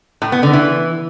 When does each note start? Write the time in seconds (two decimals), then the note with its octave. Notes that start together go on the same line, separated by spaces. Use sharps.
0.22 A2
0.32 B3
0.43 D3
0.53 E3